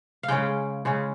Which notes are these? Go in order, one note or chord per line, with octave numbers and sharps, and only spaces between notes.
F5
C#3 G#3 C#4 G5
C#3 G#3 C#4